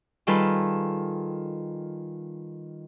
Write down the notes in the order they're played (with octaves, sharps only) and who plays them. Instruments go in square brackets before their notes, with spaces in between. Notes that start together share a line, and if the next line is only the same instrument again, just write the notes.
[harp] D#3 G3 F4 G#4 A4 B4